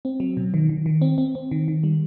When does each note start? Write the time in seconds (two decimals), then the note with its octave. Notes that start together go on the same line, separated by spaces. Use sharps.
0.05 C4
0.20 F#3
0.37 B2
0.54 D#3
0.69 D#3
0.86 D#3
1.02 C4
1.18 C4
1.35 C4
1.51 D#3
1.68 D#3
1.83 G3